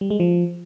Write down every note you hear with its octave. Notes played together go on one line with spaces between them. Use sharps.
G3
G#3
F3